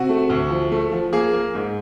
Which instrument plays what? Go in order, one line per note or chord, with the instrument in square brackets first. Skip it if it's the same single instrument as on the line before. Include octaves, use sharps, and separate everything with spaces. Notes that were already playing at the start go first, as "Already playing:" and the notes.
Already playing: [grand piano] C3 F#4
A3
D2
F3
A3
F3
A#3 G#4
A#3
G#2